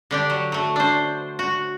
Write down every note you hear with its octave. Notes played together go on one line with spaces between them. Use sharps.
D3 D4 G4
F#3
F#3 A3
D4 C5
F#4